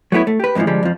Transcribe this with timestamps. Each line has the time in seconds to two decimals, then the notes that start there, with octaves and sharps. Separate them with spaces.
0.12 F#3 A3 B3 E4 C#5
0.27 A3
0.40 G4 B4
0.55 F2 G#2 B2 E3 F3
0.67 D3 F3 G3 G#3
0.83 F2 F3